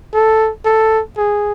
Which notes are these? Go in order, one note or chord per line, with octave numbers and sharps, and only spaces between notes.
A4
A4
G#4